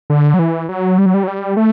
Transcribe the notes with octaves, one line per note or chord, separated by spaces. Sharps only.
D3
F#3
E3
F#3
G3
F#3
G3
F#3
G3
A3